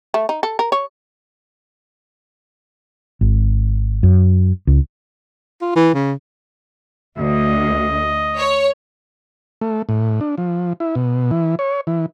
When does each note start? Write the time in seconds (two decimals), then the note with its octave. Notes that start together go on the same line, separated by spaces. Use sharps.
0.14 A3
0.29 D#4
0.43 A4
0.59 A#4
0.72 C#5
3.21 G#1
4.03 F#2
4.67 C#2
5.61 F4
5.76 E3
5.94 C#3
7.18 D2 D#5
8.38 C#5
9.61 A3
9.89 A2
10.21 D4
10.38 F3
10.80 E4
10.95 B2
11.31 E3
11.59 C#5
11.87 E3